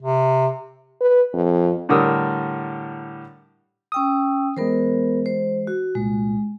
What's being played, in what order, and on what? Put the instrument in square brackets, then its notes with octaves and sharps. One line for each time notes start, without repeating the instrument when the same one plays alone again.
[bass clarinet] C3
[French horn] B4
F2
[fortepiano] A2 D3 G3 A#4 D#6 E6
[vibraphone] C#4 G5 E6 [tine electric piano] D#6
[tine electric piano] E3 G#3 [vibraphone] B3 A#4 C5
[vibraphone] C5
F#4
[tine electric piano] C2 A#2 [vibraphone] G#3